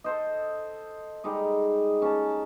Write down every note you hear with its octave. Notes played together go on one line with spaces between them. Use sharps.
A4 C5 D#5
G3 G#3 D#4 D#5
C#4 A#4 A5